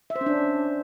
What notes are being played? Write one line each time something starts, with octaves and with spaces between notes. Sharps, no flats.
E5
C5
C#4
D4